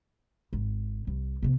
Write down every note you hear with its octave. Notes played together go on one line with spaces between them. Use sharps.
G#1
C2
C3 B3